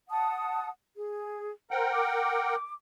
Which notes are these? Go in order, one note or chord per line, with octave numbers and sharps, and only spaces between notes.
F#5 A5 D#6
G#4
A#4 C5 F#5 G5 A#5
D6